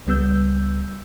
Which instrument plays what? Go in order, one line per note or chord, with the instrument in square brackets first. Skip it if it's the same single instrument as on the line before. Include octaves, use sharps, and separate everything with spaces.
[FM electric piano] C#2 G3 B3 E6 G6